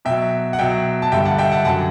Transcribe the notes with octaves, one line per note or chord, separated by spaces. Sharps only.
B2 F#3 E5 G5
F#5
B2 F#3 E5 G5
A5
G2 D3 G3 E5 G5
F#5 A5
E5 G5
F#5 A5
F#2 D3 F#3 F#5 A5